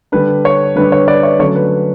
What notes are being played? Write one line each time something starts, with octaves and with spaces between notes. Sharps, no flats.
D3 G3 D4 B4
C#5
D3 G3 D4 B4
C#5
B4 D5
C#5 E5
D3 F#3 A3 C#4 C#5
B4